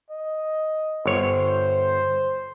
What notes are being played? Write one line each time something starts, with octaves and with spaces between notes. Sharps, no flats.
D#5
G1 C5 C#5